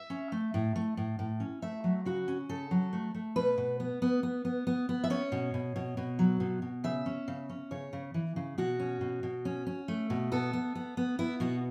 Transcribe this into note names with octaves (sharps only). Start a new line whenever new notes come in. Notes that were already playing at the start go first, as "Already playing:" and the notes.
Already playing: E5
C#4
A3
A2
A3
A2
A2
C#4
A3 E5
F#3
C#3 F#4
C#4
C#3 A4
F#3
A3
A3
B2 B4
B2
B3
B3
B3
B3
B3
B3
E5
C#4 C#5
B2
B2
B2
B2
F#3
B2
B2
C#3 E5
C#4
C#3
C#4
C#3 C#5
C#3
E3
C#3
B2 F#4
C#4
B2
B2
C#4
C#4
A3
B2
B3 A4
B3
B3
B3
B3 E4
B2 F#4